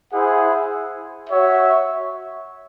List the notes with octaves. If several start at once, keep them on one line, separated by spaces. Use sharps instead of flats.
E4 G#4 C5 F#5
F#4 C#5 E5